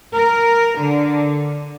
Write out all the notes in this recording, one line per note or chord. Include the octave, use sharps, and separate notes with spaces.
A#4
D3